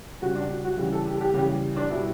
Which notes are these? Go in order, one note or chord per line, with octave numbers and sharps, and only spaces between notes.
C#3 G3 F#4
D4
F#4
F#4
C#3 E3 G3
A4
G4
A4
G4
C#3 E3 G3 G4
D4
B2 G3 E4